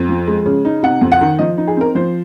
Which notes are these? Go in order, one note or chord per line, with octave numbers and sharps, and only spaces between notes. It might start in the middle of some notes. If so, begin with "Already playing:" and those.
Already playing: F2
F3
G#3
C#3
D#4
C3 F#5
F2
F#5
D#3
F3 D#5
D#4
G#4
C4 A#4
F3 C5